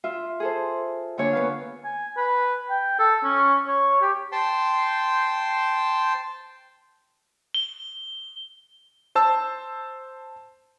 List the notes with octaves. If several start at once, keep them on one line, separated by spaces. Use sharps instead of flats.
F4 E5
G#4 A4 C5
D3 A#3 D4 C#5 G#5 C#6
B3 B4 F5
G#5
B4
G5
A4
C#4
C#5
G4
C5 G5 A5 C6
G7
C5 A5 E6